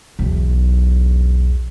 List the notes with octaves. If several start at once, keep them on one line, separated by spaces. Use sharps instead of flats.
B1 E2